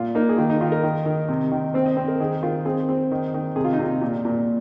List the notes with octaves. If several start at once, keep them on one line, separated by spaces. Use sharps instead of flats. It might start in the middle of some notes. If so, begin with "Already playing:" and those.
Already playing: A#2 F4
A#3 D#4
G#4
D#3 F4
D#4
D#3 F4
A#4
D#3
D#3
C3
D#3
C4 C5
D#5
C4 C5
A#4
D#3 G#4
D#3 F4
C4 G#4
C4
D#3
D#3
C3 G#4
F4
D#4
C3 F4
A#2
A#2